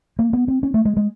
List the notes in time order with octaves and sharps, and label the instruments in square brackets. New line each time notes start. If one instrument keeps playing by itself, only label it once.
[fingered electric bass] A#3
B3
C4
C#4
A3
G#3
G#3